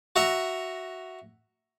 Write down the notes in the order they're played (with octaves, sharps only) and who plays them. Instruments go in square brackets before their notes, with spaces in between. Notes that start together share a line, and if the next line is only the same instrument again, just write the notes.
[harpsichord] F#4 E5 A#5